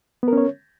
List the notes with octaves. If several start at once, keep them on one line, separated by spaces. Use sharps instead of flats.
B3 C#4 A#4 C#5